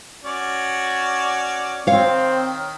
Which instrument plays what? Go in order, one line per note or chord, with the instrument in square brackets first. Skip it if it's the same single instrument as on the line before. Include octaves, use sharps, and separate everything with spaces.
[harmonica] C#4 F#4 D5
[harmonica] D#3 [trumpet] C4 [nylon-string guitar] C#5 F5